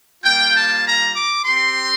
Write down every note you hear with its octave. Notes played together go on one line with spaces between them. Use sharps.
G3 A#3 F4 G5
A5
A#5
D6
C4 G4 C6